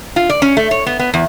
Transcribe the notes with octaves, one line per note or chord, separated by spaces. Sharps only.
F4
D5
C#4
A3
C#5
B3
B3
E2